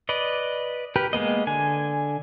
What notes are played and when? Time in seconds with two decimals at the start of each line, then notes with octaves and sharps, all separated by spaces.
0.09 B4 D5 D#5
0.96 G4 A#4 B4
1.13 G#3 A#3 B3 D#5
1.47 D3 G#5